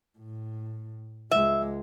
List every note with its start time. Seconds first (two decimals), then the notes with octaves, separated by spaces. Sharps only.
0.18 A2
1.31 C#2 G#3 E5